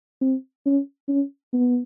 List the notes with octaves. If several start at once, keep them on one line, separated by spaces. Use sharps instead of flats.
C4
C#4
C#4
B3